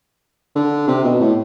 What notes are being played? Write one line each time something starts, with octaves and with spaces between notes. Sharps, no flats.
D3
C3
B2
A2